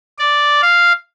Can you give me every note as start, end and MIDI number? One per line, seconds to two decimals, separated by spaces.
0.19 0.61 74
0.62 0.92 77